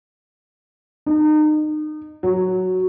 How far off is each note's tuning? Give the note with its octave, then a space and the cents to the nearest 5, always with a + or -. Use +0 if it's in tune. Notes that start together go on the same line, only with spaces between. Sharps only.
D#4 -30
F#3 +0